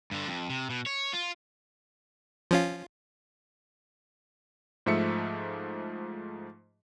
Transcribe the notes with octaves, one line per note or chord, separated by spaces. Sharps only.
G2 D3
F2
C3
B2
C#5
F4
F3 C#4 F4
G#2 F3 A3 E5 C#7